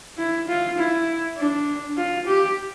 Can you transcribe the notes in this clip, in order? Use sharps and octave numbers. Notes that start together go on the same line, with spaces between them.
E4
F4
E4
D4
F4
G4